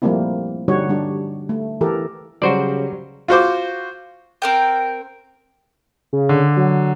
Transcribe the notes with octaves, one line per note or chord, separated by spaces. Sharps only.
F3 G3 A3 A#3 C4 E4
D3 G3 D#4 F#4 C#5
G3 D4 G4
A3
E3 G4 A4 A#4
C#3 F#3 G3 F#4 C5 D5
F4 F#4 C5 D6
C4 A#4 G5
C#3
D3
F#3